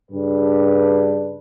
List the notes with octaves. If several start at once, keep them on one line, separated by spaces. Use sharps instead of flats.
G2 C#3 D4 G4 B4